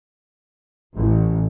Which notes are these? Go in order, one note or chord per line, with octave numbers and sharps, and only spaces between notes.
A1